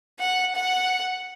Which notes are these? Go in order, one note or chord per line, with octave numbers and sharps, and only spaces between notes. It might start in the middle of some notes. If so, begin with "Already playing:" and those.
F#5
F#5